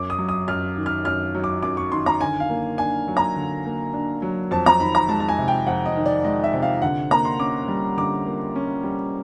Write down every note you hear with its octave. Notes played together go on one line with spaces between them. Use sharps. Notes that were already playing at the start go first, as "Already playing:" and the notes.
Already playing: F#2 D6
D#6
F#3
D#6
F#2 F6
D#3
F6
F#2 F6
F#3
D6
F#2 D6
C#6
D#3 C6
A#5
D3 G#5
F5
A#3
D4 G#5
F#3
A#5
D3
A#3
D4
F#3
F2 A5
A#5
D#3 B5
A#5
G#3 A5
A5
G#5
C3
G5
F2 F#5
D#5
D#3
D5
G#3 D#5
E5
C3
F5
D3 F#5
A#3 A#5
C6
C#4 D6
G3
D3 D6
A#3
C#4
G3